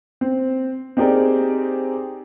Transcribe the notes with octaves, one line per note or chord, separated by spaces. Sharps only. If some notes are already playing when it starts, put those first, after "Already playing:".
C4
C4 D#4 G4 G#4 A#4 D5